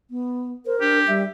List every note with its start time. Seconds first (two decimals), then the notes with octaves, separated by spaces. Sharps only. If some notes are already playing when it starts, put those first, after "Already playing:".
0.11 B3
0.66 A#4 C5
0.81 D4 G4
1.08 G3 E5